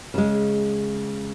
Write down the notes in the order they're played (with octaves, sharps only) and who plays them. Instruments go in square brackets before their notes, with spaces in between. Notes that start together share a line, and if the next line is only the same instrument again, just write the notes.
[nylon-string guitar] C#3 G#3